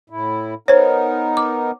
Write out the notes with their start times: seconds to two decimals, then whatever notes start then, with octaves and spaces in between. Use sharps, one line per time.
0.10 A2 E4
0.68 B3 D#4 A#4 C5 C#5
1.37 D6